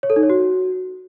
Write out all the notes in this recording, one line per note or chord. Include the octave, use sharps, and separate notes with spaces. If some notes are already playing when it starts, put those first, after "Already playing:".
C#5
A4
D#4
C#5
F#4